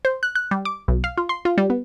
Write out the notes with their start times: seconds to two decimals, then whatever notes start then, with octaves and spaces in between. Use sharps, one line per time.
0.05 C5
0.23 F#6
0.35 F#6
0.51 G3
0.65 D6
0.88 B1
1.04 F5
1.17 F4
1.29 C6
1.45 F4
1.58 G3
1.70 B3